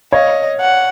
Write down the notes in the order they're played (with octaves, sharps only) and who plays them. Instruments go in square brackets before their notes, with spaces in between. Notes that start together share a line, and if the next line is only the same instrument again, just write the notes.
[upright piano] C#5 F5 [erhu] D#5
[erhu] F#5